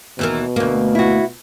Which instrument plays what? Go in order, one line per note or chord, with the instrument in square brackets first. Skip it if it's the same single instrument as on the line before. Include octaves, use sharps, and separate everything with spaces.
[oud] D#2 E3 A#4 [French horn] B2
[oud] D2 A#3
[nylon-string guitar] E4 F#4